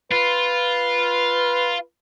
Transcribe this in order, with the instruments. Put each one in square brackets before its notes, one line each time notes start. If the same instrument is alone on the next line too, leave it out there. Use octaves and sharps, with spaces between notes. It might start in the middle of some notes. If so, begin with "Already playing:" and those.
[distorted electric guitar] F4 [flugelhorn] B4